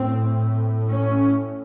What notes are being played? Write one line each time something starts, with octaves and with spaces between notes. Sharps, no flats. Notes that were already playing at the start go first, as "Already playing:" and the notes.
Already playing: A2 C4
C#4